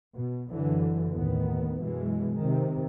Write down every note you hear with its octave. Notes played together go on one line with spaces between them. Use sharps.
B2
F#1 D3 E3 F#3
D#2 A2 D#3 B3
F#2 B2 E3 G#3
C3 D#3